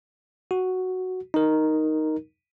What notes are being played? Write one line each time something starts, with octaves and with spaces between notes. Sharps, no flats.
F#4
D#4 A#4